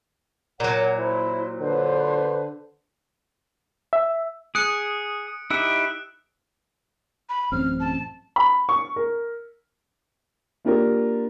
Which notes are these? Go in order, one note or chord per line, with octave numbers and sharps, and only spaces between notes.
A#2 F#3 A#4 C#5 F#5
E4 C5
D3 B4 C5
E5
G#4 D#6 F#6 C#7 D7
D#4 E4 G4 E6 F#6
B5
A1 F#2 C4 F6
A5
B5
C#6
A#4
A#3 D4 F4 G4 A#4